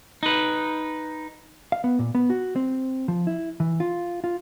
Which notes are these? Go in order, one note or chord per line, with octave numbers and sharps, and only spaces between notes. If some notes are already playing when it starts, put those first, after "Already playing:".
D#4 B4
F5
B3
A#2
B3
F#4
C4
F3
E4
E3
F4
F4